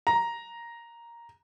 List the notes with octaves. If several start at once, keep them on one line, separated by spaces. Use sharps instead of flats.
A#5